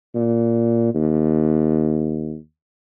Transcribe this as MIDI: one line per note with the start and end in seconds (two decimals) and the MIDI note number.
0.15 0.90 46
0.94 2.36 39